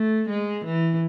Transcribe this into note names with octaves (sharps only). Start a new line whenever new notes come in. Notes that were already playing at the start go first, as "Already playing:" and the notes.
Already playing: A3
G#3
E3